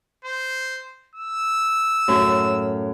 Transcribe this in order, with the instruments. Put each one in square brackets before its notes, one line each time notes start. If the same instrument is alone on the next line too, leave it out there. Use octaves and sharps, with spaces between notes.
[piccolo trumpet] C5
E6
[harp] F#2 A2